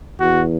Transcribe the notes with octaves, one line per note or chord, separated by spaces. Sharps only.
E2 F#4